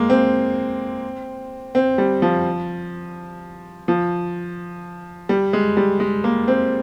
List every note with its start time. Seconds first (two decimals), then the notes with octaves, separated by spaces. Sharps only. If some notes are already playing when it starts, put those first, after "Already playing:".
Already playing: G#3 A#3
0.10 C4
1.75 C4
1.98 G3
2.22 F3
3.88 F3
5.29 G3
5.53 G#3
5.77 G3
6.00 G#3
6.24 A#3
6.48 C4